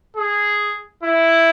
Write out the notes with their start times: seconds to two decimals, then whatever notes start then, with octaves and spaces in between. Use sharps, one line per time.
0.16 G#4
1.03 E4